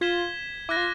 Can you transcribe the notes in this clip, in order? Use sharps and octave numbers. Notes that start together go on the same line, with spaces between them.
F4 G#6 B6 E7 G7
E4 D6 F#6 A#6
F4